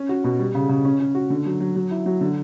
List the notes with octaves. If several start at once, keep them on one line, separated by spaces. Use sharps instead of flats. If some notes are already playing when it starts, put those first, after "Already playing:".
Already playing: C#4
F#4
B2
G3
C#3
C#3
C#4
C#4
F#4
D3
F#3
F#3
F#3
E4
F#3
D3